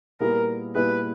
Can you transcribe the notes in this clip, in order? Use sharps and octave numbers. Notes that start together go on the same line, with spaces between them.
A#2 G3 B3 E4 G#4 A#4
A#2 G3 B3 E4 G#4 B4